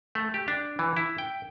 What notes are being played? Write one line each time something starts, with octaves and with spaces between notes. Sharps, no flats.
A3
G4
D4
E3
E4
G5